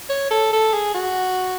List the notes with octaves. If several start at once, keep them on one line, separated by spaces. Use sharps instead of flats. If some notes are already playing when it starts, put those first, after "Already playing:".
C#5
A4
A4
G#4
F#4